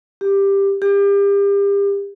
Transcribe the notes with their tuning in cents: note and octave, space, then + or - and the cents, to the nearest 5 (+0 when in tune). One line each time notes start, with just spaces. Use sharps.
G4 +10
G4 +35